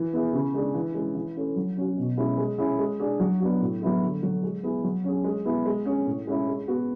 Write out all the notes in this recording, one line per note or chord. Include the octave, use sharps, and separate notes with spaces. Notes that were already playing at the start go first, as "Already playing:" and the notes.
Already playing: E3
B3 E4 G#4
C#3
G#3 D4 G#4
E3
G#3 C#4
E3
A3 C#4
F#3
C#4 F#4
B2
G#3 C#4 E4
G#3
C#4 E4 G#4
G#3
D4 G#4
F#3
B3 D4 F#4
A2
F#3 B3 E4 G#4
D3
F#3 A3
G#3
B3 E4 G#4
F#3
C#4 G#4
G#3
B3 E4 G#4
G#3
C#4 G#4
A2
G#3 C#4 E4
G#3
B3 F#4